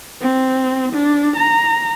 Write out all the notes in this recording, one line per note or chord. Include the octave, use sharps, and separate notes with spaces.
C4
D4
A#5